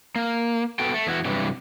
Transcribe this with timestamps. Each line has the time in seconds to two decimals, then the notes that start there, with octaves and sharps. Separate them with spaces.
0.16 A#3
0.79 B3 F#4 A4 G5
0.94 A3
1.07 E2 E4 F#4
1.25 G2 C3 E3 F#3